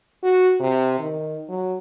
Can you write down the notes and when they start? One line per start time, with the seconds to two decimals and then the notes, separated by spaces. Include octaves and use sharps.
0.23 F#4
0.60 C3
0.99 D#3
1.49 F#3